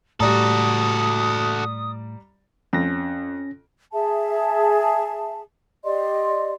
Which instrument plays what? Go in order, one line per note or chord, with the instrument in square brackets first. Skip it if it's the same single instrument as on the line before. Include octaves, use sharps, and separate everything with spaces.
[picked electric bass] A2 [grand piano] G3 D5 A#5 [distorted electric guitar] F#4 A4 [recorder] D#6
[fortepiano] F2 [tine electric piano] C#4 A#6
[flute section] G#4 E5 A5
G4 D5 D#5 C6